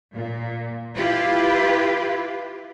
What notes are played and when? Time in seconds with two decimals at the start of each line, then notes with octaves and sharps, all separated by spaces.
0.13 A#2
0.95 E4 F4 G4 B4